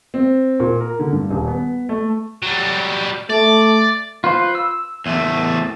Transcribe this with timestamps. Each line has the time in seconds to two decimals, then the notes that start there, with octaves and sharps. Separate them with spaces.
0.14 C4
0.60 A#2
0.80 A#4
0.99 D3
1.12 G2
1.30 D#1
1.48 B3
1.89 A3
2.43 F#3 G3
3.30 A3 D5
4.24 F4 B4 C5
4.55 E6
5.06 E2 A3